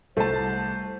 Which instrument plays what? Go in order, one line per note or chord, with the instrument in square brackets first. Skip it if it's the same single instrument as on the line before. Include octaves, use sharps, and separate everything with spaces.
[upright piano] C2 A5 [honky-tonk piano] A3 [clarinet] C5